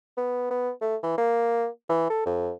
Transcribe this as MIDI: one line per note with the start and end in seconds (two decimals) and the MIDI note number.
0.17 0.47 59
0.50 0.71 59
0.81 0.96 57
1.03 1.16 52
1.18 1.67 58
1.90 2.09 52
2.10 2.25 69
2.26 2.51 41